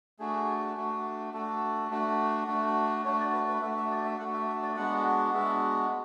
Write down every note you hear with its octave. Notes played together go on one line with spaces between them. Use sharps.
A3 D4 F#4 G#4
A3 D4 F#4
A3 D4 F#4 A4
A3 D4 F#4
A3 D4 F#4
A3 D4 F#4 C#5
D5
B4
B4
A3 D4 F#4 E5
E5
D5
E5
A3 D4 F#4 F#5
E5
E5
D5
G#3 B3 D4 F#4 F#5
G#3 B3 D4 F#4 E5